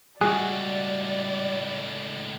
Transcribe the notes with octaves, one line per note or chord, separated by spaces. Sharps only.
C#2 A2 G3 F#4 G#4 D5 G#5 F#6